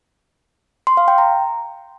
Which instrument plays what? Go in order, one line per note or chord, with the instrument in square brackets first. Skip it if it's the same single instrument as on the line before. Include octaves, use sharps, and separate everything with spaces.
[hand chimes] C6
F5
G5
A#5